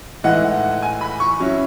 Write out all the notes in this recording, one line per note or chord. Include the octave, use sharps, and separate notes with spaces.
A2 E3 G#3 D#4 F#5
G#5
B5
C#6
F#3 C#4 E4